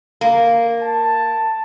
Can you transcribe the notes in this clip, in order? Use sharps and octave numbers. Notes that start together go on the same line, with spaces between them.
A#3
A5